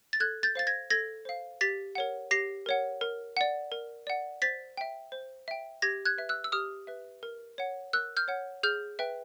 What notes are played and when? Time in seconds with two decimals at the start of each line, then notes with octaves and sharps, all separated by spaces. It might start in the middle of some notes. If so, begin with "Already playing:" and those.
0.13 A6
0.20 A4 F#6 G#6
0.43 G6 A6
0.55 C5 F5 A6
0.67 G#6 A#6
0.90 A4 G#6 A#6
1.25 C5 F5
1.61 G4 A6 B6
1.95 A#4 C#5 F#5
2.31 G4 A#6 C7
2.66 A#4 C#5 F#5
3.01 A#4
3.37 D5 F#5
3.72 A#4
4.07 D5 F#5
4.42 C5 A6 B6
4.77 E5 G5
5.12 C5
5.48 E5 G5
5.82 G4 G#6 A#6
6.05 F#6 G#6
6.18 B4 E5
6.29 E6 F#6
6.44 E6
6.52 G4 D#6 F6
6.87 B4 E5
7.23 A#4
7.58 C#5 F#5
7.93 A#4 E6 F#6
8.17 F6 G6
8.28 C#5 F#5
8.63 G#4 F6 G6
8.99 B4 E5 G5